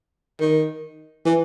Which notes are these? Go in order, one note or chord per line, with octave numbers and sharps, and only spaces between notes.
D#3
E3